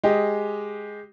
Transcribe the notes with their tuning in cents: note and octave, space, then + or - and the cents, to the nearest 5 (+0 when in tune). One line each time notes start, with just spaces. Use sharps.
G#3 +0 G4 +0 D#5 +0